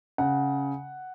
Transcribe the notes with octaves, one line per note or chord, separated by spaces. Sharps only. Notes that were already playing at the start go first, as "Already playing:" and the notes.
C#3 F#5